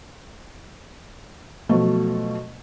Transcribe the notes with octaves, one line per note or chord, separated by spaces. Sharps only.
B2 F3 F#3 A3